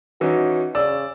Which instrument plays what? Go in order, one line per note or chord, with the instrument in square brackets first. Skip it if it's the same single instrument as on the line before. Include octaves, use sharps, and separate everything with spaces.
[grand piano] E3 C#4 D#4 [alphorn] F#4
[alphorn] C#3 [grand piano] D5 E6